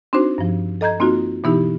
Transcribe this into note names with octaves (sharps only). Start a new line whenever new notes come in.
C4 D4 D#4 F#4 C5
G2 F3
A4 D#5 A#5 G6 G#6
A#3 C4 D#4 F4 F#4
B2 E3 B3 D#4 E4 G4